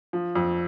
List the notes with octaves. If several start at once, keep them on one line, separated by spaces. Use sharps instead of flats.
F3
F2